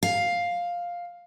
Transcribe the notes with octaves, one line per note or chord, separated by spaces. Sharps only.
F5